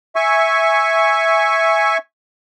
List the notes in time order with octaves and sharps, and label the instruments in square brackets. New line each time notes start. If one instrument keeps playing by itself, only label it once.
[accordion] E5 G#5 C#6